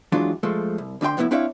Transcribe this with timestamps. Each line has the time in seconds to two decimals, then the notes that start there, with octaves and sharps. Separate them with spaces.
0.12 E3 F#3 G#3 D4 F4
0.43 F3 G#3 A3
0.78 C2
1.01 D2 D3 D#4 G5 C6
1.17 F2 A2 B3 C#4 E4
1.31 C4 D4 E4 C#5 E5 F5